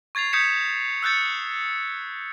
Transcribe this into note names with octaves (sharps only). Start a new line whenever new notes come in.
C#6 G#6 A6 C7 F7
D#6 G6 G#6 B6 C#7 E7
E6 F#6 G6 A6 C#7